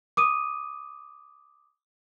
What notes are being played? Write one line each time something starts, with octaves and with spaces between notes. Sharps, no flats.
D6 D#6 D#7